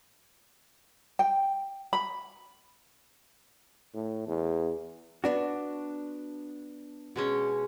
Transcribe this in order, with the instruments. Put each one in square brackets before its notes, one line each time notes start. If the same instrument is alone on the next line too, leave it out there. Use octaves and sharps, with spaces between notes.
[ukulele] G5
B5
[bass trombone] A2
E2
[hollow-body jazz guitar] B3 D4 F#4
[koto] B2 G#3 C#4